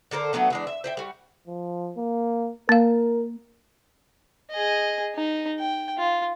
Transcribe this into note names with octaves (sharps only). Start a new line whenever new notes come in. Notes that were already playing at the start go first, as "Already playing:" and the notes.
D3 A4 A#4 C5
F#3 A3 B3 D4
E3 G#3 D4
E5
C5 E5 G5
G3 F#4
F3
A#3
A#3 A#4 F5
G#4 D#5
D#4
G5
F4